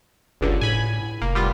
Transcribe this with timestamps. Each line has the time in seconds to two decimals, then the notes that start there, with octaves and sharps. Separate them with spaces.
0.41 F#1 C#2 G2 D3
0.61 A2 G#5 B5
1.22 F1 A#3
1.35 G3 B3 F4